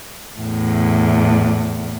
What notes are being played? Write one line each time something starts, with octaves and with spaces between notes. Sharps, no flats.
E2 A2